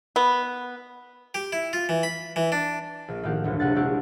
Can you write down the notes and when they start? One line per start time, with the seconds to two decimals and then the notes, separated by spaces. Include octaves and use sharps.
0.16 B3
1.35 G4
1.52 E4
1.73 F4
1.89 E3
2.03 B5
2.36 E3
2.52 D4
3.08 A#1
3.23 A2 D#3 F3 A#3 G4 F#5
3.44 G1 D2 F#3
3.60 F1 A#1 C3 F#5 A6
3.75 G#3 C4 D4 E4 F#4 G4